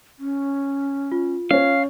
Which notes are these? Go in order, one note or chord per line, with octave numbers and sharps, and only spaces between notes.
C#4
F4
C#4 C#5 F5